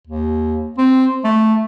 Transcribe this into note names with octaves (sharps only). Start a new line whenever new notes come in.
D#2
C4
A3